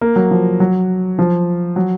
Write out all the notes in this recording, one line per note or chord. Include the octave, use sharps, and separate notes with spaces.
A#3
F#3
F3
F#3
F3
F#3